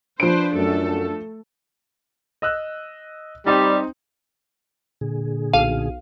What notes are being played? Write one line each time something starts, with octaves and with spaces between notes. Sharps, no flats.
F3 D4 B4 C5 D7
F#2 A3 A4
D#5 E6 F#6
G3 C4 D#4
A#2 D3 G#4
B1 F5 D#7